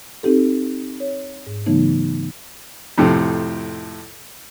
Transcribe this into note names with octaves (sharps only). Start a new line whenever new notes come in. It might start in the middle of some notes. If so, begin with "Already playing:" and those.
C4 D#4 G4 A4
C#5
G#2
C#3 E3 F#3 A3 B3 D#4
F2 A2 C3